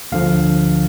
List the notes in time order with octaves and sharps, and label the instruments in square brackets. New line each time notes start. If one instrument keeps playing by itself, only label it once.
[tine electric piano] D2 D3 F3 F5